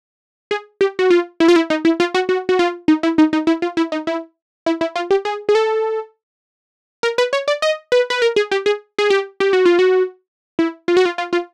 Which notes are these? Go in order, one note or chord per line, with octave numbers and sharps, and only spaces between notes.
G#4
G4
F#4
F4
E4
F4
E4
D#4
E4
F4
F#4
F#4
F#4
F4
D#4
E4
D#4
D#4
E4
F4
E4
D#4
E4
E4
E4
F4
G4
G#4
G#4
A4
A#4
B4
C#5
D5
D#5
B4
B4
A#4
G#4
G4
G#4
G#4
G4
G4
F#4
F4
F#4
E4
F4
F#4
F4
F4
F4